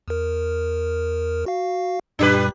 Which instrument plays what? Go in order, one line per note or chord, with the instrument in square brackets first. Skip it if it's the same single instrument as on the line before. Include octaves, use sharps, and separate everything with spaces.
[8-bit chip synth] E2 A#4
F#4 F5
[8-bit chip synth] F#2 A#2 G3 [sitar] D4 G4 B4